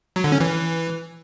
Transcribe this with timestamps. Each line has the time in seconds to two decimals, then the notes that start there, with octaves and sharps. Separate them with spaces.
0.16 F#3
0.24 D3
0.32 C#4
0.40 E3